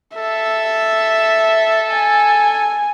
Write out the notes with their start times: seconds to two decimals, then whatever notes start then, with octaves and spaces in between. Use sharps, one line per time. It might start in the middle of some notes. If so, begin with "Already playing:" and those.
0.16 A4 E5
1.91 G#5